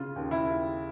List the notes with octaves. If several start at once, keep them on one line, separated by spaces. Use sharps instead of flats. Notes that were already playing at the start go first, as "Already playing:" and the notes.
Already playing: C#3 F4
D#2
E4
D#2